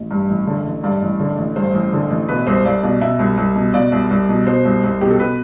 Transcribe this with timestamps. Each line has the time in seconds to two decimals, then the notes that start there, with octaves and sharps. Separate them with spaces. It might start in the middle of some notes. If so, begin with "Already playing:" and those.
Already playing: A1
0.11 G2
0.29 A1
0.47 D3
0.65 A1
0.83 G2 D5
1.02 A1
1.20 D3
1.38 A1
1.56 G2 C5
1.74 A1
1.93 D3
2.10 A1
2.28 B2 B4
2.47 C2 C5
2.65 C2 D5
2.83 B2 D5
3.01 B2 E5
3.19 C2
3.38 C2
3.56 B2
3.74 B2 D5
3.92 C2
4.11 C2
4.29 B2
4.47 B2 C5
4.65 C2
4.84 C2
5.01 B2 G4
5.10 A4
5.20 B2 B4